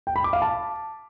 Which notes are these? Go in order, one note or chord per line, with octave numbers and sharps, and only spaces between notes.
G5
B5
D6
F5
A5